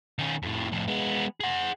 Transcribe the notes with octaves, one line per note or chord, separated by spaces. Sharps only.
D#3 C#4
F2 A2
F2 A2
G#3 B3
G#4 F#5